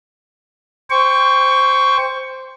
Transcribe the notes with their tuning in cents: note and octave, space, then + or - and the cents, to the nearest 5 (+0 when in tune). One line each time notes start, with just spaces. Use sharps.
C5 +0 G5 +20 C#6 +15